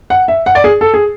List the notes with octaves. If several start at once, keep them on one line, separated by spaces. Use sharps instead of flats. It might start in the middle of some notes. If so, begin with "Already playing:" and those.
F#5
E5
F#5
D5
G#4
A4
G#4